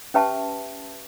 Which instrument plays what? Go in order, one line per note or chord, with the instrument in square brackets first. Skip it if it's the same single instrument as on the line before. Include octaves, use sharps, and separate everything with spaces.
[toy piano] C#4 G4 B4 E5 A5